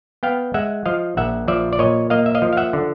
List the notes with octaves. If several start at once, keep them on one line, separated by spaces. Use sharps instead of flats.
B3 F5 G5
G#3 E5 F#5
F3 D#5 F5
A#1 E5 F#5
F3 D5 E5
D5
A#2 C#5 D#5
A#3 D#5 F5
E5
D#5 F5
F3
F5
E5 F#5
D3